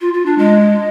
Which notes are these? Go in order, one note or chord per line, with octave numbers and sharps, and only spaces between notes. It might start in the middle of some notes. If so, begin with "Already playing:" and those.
F4
F4
D4
G#3